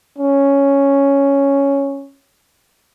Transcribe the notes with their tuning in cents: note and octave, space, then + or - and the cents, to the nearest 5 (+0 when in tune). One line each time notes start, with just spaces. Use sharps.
C#4 +0